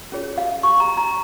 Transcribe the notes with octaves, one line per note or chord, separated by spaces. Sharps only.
C#4 F4 G#4 C#5
F5
C#6
A#5
A#5